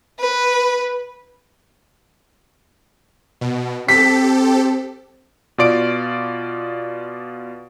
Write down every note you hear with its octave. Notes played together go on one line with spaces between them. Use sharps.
B4
B2
C4 G4 A4 B6
B2 F4 D5 D7